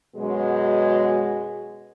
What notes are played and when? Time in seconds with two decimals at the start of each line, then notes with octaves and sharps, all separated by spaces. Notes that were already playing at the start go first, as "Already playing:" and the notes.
0.16 F#2 B2 F#3 G#3